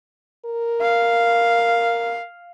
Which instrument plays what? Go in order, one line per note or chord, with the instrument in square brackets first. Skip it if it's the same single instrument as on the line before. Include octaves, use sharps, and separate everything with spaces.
[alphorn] A#4
[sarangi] F5